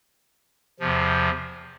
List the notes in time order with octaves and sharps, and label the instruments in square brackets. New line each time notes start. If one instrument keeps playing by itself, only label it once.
[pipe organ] E2 C3 F3